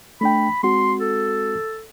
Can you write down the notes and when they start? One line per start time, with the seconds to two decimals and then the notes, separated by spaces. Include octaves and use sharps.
0.21 A3 D4 G5 B5
0.63 G#3 C4 F#4 C6
1.00 A4